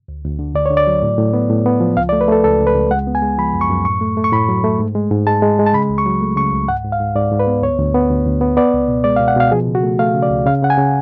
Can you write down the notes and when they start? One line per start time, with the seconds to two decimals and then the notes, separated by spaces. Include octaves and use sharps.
0.08 D2
0.24 D2
0.39 D3
0.55 D2 D5
0.66 D3 C#5
0.77 D5
0.87 F#3
1.03 A2
1.18 A2
1.33 B3
1.50 A2
1.66 B3
1.80 F3
1.97 C#2 F5
2.09 D5
2.13 A3
2.21 B4
2.28 A3 A4
2.44 C#2 A4
2.60 C#2
2.67 B4
2.75 C#2
2.91 G#3 F#5
3.07 B3
3.15 G#5
3.22 G#3
3.38 F3 B5
3.54 F#2
3.61 C#6
3.70 F#2
3.85 A2 C#6
4.01 A3
4.17 A3
4.24 C#6
4.32 A2 B5
4.49 F#3
4.64 A3
4.79 G#2
4.95 G#3
5.11 G#2
5.27 G#3 A5
5.42 G#3
5.59 G#3
5.66 A5
5.74 C#3 B5
5.89 C#2
5.98 C#6
6.06 F#3
6.21 A3
6.36 C#3 C#6
6.53 C#2
6.68 G#2 F#5
6.84 G#2
6.92 F5
7.00 G#2
7.15 G#2 D5
7.32 G#2
7.39 B4
7.47 B3
7.62 D2 C#5
7.79 D2
7.94 B3
8.10 D2
8.26 D2
8.41 B3
8.57 B3 D5
8.74 C#2
8.88 B2
9.04 G#3 D5
9.16 F5
9.20 B2
9.28 F#5
9.36 B2 F5
9.52 F3 G#4
9.67 C#3
9.75 F#4
9.83 A3
9.99 A3 F5
10.15 C#3
10.22 D5
10.30 C#2
10.46 C#3 F5
10.62 C#3 F#5
10.70 G#5
10.77 C#3